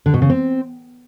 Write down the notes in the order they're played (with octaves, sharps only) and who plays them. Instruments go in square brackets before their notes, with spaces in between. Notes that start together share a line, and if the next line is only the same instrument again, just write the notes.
[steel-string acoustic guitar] D3
B2
C#3
C4